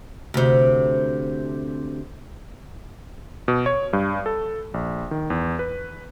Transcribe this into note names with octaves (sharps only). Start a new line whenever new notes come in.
D2 C3
B2
C#5
G2
A4
A#1
D#3
E2
B4